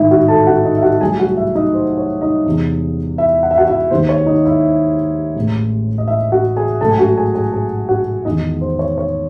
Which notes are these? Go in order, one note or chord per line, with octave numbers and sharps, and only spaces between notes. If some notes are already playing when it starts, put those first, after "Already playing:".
Already playing: A1 G#2 D#3 G#3 D#4 E4 D#5 E5
F#4 F#5
A4 A5
F#4 F#5
D#4 D#5
E5
F#4 F#5
C2 C3 F#3 A3 G#4 G#5
F#4 F#5
E4 E5
D#4 D#5
C5
C#5
D#4 D#5
E2 C3 E3 G#3
E4 E5
F#5
E5
F#4 F#5
E4 E5
D#2 D#3 G#3 C5
C#5
D#4 D#5
E4 E5
A1 A2 G#3
D#5
E4 E5
F#4 F#5
G#4 G#5
A1 G#2 F#3 A3 A4 A5
G#5
F#4 F#5
G#4 G#5
G#4 G#5
G#4 G#5
F#4 F#5
E2 D#3 G#3 D#4 D#5
C5
C#5
C#5